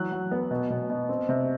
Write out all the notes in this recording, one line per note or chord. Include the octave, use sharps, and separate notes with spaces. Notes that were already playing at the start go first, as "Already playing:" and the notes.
Already playing: E3 F#3 F#6
F#3
B3
B2
B2
B2
C4
C3